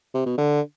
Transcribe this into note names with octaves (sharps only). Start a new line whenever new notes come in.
C3
B2
D3